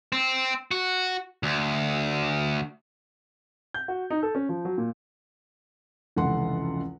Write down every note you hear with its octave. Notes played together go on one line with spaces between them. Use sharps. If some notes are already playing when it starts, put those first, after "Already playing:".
C4
F#4
D2
G6
F#4
D#4
A4
C#4
F3
F#3
A#2
F1 C#2 E3 A4 F#5 C6